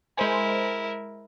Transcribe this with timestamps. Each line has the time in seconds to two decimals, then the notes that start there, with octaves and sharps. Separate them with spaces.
0.17 G#3 E4 A#4 C5 G#5